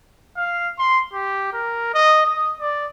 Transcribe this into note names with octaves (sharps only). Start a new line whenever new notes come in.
F5
C6
G4
A#4
D#5
D#6
D5